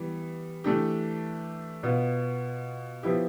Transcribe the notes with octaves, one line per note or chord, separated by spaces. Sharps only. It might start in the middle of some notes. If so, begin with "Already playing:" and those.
Already playing: E3 G3 B3
E3 A3 D4 G4
B2 B3 F4
F3 B3 E4 G4